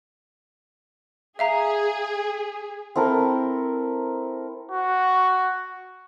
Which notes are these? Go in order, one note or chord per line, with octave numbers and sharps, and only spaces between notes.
G#4 E5 F5 A#5
C4 E4 A4 A#4
F#4